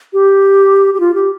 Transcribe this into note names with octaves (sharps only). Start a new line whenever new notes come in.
G4
G4
F4
G4